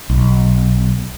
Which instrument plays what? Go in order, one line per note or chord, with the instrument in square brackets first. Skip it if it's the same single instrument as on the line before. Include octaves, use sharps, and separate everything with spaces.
[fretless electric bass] B1